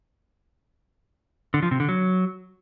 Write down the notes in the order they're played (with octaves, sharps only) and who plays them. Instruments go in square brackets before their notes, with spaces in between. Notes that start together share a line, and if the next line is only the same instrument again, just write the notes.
[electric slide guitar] D3
F3
C3
D3
F#3